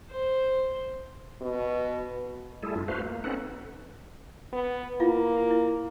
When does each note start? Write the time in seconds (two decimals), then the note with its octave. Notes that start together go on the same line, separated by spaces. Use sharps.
0.10 C5
1.41 B2
2.63 G3 A3 E4 G#4 A4
2.76 F#2 D4 E4 F4
2.88 A3 F#4 B4 C5 F5
3.06 A#3
3.24 C4 C#4 D#4 A4 B4 F#5
4.53 B3
5.00 A#3 E4 F4 F5
5.50 E4